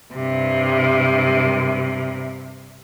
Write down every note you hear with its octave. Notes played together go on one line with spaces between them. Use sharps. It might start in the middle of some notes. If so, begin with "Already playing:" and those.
G2 C3